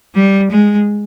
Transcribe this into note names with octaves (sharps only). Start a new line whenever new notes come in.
G3
G#3